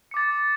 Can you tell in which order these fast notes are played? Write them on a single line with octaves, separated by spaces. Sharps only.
C#7 D6 A6